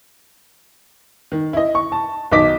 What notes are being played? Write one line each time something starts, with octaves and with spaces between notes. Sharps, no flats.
D#3
E4 D#5
C#6
A5
B1 D#3 D#4 D#5 D6 B6